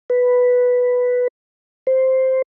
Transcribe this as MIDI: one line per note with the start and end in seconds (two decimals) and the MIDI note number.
0.10 1.28 71
1.87 2.42 72